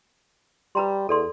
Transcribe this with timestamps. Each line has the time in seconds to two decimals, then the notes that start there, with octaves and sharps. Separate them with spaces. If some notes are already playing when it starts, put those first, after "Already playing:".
0.75 G3 B4 A#5 C6
1.09 E2 A4 D5 C6